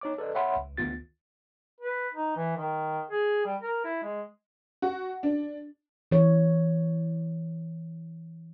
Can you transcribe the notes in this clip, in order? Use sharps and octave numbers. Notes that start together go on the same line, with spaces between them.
D#4 C#5 D6
A4 B4 D5 D#5
C#5 E5 F#5 B5 C6
C#2
D2 D#3 B3 F4 A6
B4
D#4
E3
D#3
G#4
G3
A#4
E4
G#3
F#4
D4
E3 C#5